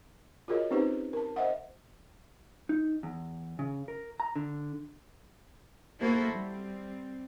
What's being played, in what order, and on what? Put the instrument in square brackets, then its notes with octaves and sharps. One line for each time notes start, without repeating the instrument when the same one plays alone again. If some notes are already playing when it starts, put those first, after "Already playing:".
[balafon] F4 F#4 G#4 A#4 C#5 D#5
C4 C#4 D#4 G4 B4 C5
A#4 A5
C5 D#5 E5 F#5
[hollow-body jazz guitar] D#4
E2
C#3
A#4
A#5
D3
[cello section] A#3 E4 F#4 A4 C5
G3 C4